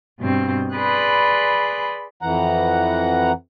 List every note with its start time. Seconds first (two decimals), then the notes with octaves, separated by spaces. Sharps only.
0.18 G2 B2 C4
0.74 G#4 B4 D5 B5 C6 F#6
2.22 F2 E3 F#5 A#5